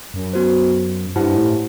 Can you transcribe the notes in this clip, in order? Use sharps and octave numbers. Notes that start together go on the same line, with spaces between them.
F#2
B3 F#4 C5
G2 E4 G4 C5 F#5 A5
A2